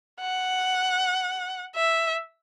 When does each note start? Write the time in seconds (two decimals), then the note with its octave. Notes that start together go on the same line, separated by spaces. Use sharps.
0.21 F#5
1.76 E5